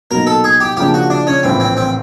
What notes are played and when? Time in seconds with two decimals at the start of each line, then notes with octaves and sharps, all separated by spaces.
0.10 B2 F#3 A#3 D#4 A#4
0.27 A4
0.44 G#4
0.60 G4
0.77 C#3 F3 A#3 D4 G4
0.94 F#4
1.10 D4
1.27 C#4
1.43 A#1 A2 E3 C4
1.60 C4
1.77 C4